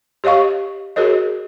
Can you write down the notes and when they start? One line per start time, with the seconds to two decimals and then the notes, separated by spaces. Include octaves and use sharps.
0.24 G4 C#5 D#5 F5 C#6
0.96 F#4 G#4 A#4 C#5 D#5